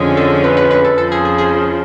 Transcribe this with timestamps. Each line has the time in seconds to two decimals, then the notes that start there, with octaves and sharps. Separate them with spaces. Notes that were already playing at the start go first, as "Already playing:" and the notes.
Already playing: F2 D3 F3 G#3 C#4 G#4
0.17 A4
0.44 B4
0.57 B4
0.71 B4
0.84 A4
0.98 F2 C#3 F3 A4
1.12 G#4
1.25 G#4
1.38 G#4